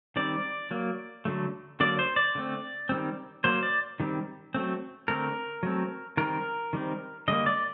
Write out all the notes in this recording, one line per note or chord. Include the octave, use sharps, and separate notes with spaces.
D#3 G3 C4 D5
F#3 A#3
D3 F#3 A3
D3 F#3 A#3 D5
C5
D5
D3 A3 C4
D#3 G3 C4
F#3 A#3 C5
D5
D#3 G3 C4
F#3 A3 C4
D3 A3 C4 A#4
F#3 A3 C4
D#3 G3 C4 A#4
D#3 G3 C4
D3 G3 A#3 D#5
D5